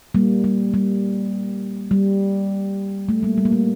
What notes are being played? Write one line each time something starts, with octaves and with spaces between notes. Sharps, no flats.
G3 A#3
G3
G3
G3
A3
G3 A#3
G3
A#3
A3